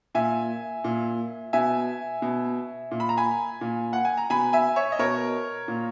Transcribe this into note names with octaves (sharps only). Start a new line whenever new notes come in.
A#2 E5 G#5
A#2
B2 E5 G#5
B2
A#2
B5
A#5
G#5 B5
A#2
F#5
G#5
A#5
B2 G#5 B5
E5 G#5
C#5 E5
D#5
B2 A#4 C#5
A#2